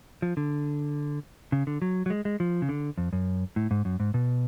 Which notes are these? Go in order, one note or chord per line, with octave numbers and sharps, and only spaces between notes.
F3
D3
C#3
D3
F#3
F#3
G#3
G#3
F3
C#3
D3
F2
F#2
A2
G#2
F#2
G#2
B2